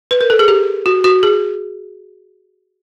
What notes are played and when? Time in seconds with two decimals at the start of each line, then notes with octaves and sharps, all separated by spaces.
0.11 B4
0.21 A#4
0.30 A4
0.39 G#4
0.48 G4
0.86 F#4
1.04 F#4
1.23 G#4